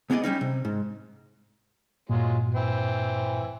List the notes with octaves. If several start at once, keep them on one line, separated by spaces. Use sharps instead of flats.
C#2 B3 G#4 D5 D#5
G3 A3 C#4 D#4
C3
G#2
G2 A#2 F#3 G#3 F4
E3 C4